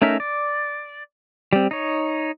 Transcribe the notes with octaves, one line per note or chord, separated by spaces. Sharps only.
A3 C#4 D#4 A#4 E5
D5
G3 C4
D#4 C#5